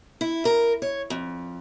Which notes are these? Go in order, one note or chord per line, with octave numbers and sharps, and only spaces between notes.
E4
A#4
C#5
F2